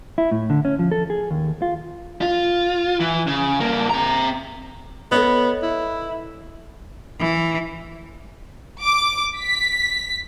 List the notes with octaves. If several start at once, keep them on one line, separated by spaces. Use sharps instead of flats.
E4
A2
D3
C#4
F3
A4
G#4
D#2
F4
F4
E3
C#3
G2 A#3
C4 A#5
B3 A4 C#5 D#5
E4
E3
D6
B6